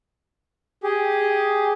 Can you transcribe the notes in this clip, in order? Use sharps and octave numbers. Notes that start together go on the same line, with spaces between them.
G4 G#4